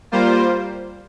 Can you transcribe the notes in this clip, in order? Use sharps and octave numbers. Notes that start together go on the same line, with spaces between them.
G3 A#3 F4 C5